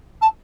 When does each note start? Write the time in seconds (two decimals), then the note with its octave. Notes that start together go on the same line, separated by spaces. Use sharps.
0.22 A5